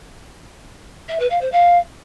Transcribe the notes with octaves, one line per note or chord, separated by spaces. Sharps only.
E5
B4
F5
C5
F5